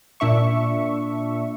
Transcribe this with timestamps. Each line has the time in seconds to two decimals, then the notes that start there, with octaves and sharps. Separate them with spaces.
0.20 A#2 D4 E5 C#6